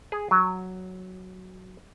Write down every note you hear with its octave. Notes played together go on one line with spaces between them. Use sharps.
G#4
F#3